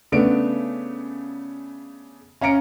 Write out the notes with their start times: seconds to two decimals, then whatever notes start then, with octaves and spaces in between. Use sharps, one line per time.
0.12 C#3 A3 B3 D4 D7
2.41 C#4 F5 A#5 C#7 D7